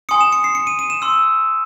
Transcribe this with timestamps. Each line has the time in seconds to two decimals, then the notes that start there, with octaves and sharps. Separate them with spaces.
0.09 G#5 C6 D#6 C#7
0.21 E7
0.33 C#7
0.44 C7
0.55 C#7
0.67 D#7
0.79 D#7
0.90 E7
1.02 C6 E6